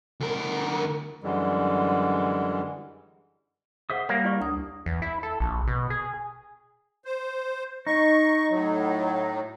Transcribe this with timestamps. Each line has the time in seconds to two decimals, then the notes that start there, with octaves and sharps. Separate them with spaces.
0.20 D2 A#4
1.23 F#2 D3 E3 G3 G#3
3.90 G#4 C5 E5 F#5 D#6
4.09 G3 A#3 C#5
4.24 E4 D5 C#6
4.40 D2 D#6
4.86 E2
5.02 E4
5.23 A4
5.40 A#1
5.68 B2
5.90 G#4
7.05 C5
7.87 D#4 C#6
8.50 A2 F#3